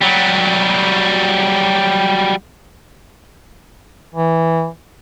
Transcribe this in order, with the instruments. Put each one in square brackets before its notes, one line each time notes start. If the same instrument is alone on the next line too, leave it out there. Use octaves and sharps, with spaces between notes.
[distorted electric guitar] F#3 G3
[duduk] E3